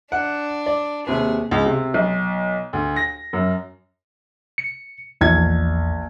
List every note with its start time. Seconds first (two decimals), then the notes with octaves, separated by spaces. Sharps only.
0.12 D4 F#5
0.66 D5
1.07 D#2 C3 G#4 B4
1.51 C#2
1.66 C3
1.94 B1
2.73 D2
2.96 A#6
3.33 F#2
4.58 C#7
5.21 A#1 E2 E3 G#6